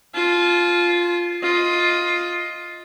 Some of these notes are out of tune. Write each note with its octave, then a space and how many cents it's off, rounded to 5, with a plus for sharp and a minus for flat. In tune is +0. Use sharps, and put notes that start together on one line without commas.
F4 +0 A5 -40
F4 +5 D#5 +15